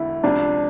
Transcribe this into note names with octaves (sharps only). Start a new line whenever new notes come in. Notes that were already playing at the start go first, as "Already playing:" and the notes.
Already playing: E1 D3 E4
C#2 C3 F3 D4